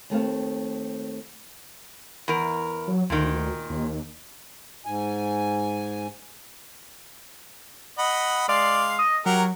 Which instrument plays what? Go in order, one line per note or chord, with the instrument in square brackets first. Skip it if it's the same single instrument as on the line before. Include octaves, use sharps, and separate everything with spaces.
[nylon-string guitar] D#2 A3 C4 F5
[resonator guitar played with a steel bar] E2 A#4
[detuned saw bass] F#3
[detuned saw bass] D2 [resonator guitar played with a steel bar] A#2 D#3
[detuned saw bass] D#2
[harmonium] G#2 G#5
[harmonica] D#5 F#5 B5
[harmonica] G#3 F5 C6 [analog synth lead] D5
[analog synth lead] D#5
[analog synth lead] F#3 [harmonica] G4 A#4 F#5